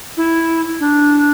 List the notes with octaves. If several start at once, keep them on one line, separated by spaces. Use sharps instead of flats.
E4
D4